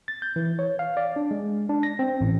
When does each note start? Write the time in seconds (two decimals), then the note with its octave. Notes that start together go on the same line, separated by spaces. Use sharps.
0.08 A6
0.22 G6
0.36 E3
0.59 C#5
0.79 F5
0.97 D5
1.16 D4
1.31 G#3
1.69 D4
1.83 A#6
1.99 C4
2.21 A1